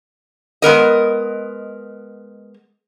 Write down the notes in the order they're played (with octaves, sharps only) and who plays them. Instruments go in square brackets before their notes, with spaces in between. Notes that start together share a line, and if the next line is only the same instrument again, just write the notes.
[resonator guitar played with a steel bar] G#3 B3 A#4 D#5